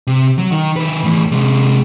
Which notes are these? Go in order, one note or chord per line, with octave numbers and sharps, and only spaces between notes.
C3
F#3
D#3
D#3 B4
E2 A2
C3 G#3